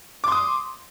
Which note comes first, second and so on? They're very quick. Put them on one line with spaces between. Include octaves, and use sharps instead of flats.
D6 C6 D#6